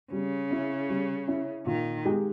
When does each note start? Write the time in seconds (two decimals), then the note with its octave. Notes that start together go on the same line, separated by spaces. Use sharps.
0.13 C#3 G3
0.51 C#4 E4
0.90 G3
1.28 C#4 E4
1.66 A#2 D#3
2.05 G#3 D#4 G4